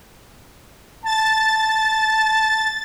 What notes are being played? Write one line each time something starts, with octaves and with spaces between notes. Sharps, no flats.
A5 A6